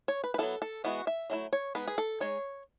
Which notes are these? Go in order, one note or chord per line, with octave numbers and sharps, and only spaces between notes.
C#5
B4
B4
F#3 B3 E4 A4
A4
E3 G#3 B3 E4 F#4
E5
F#3 A3 E4
C#5
G#3 B3 D#4 B4
G#4
A4
G#3 D#4 C#5